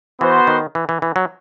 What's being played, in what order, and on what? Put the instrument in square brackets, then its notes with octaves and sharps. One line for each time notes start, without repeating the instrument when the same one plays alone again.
[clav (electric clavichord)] E3 [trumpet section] B3 F#4 C5
[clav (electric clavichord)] D#3
E3
E3
E3
F#3